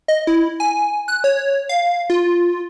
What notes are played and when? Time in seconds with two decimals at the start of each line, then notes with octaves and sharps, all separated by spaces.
0.08 D#5
0.27 E4
0.60 G#5
1.08 F#6
1.24 C#5
1.69 F5
2.10 F4